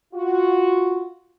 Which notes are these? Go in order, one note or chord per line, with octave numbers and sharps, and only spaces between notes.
F4 F#4